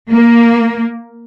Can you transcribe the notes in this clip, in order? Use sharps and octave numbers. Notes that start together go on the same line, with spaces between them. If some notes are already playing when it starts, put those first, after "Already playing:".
A#3